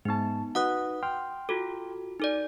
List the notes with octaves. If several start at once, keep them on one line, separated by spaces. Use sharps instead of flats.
G#2 B3 D#4 A5
D#4 F#4 B4 F#5 D#6 F#6
G5 C6 F6
F4 F#4 A4
D#4 A4 D5